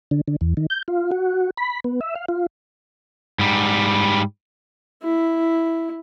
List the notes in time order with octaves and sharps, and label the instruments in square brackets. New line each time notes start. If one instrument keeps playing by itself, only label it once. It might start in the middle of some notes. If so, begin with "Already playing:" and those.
[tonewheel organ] D3
D3
E2
D#3
G6
F4
F#4
B5
B3
E5
F5
F4
[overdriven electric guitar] G#2 G3
[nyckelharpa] E4